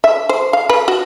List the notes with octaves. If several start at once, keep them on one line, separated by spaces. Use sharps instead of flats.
E5
C5
F5
B4
F#4